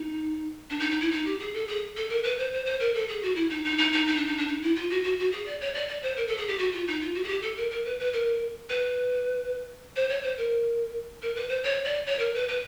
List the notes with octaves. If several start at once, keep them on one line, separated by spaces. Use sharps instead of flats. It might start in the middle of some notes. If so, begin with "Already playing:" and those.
Already playing: D#4
D4
D#4
D#4
E4
D#4
G4
G#4
A4
G#4
A4
A#4
B4
C5
C5
C5
A#4
A4
G#4
F#4
E4
D#4
D#4
D#4
D#4
D#4
D4
D#4
D4
D#4
E4
F4
F#4
F#4
F#4
G#4
D5
C#5
D5
D5
C5
A#4
A4
G#4
G4
F#4
F4
D#4
F4
F#4
G#4
G4
A4
A#4
A#4
B4
B4
A#4
B4
C5
C#5
C5
A#4
A#4
B4
C5
C#5
D5
C#5
A#4
B4
B4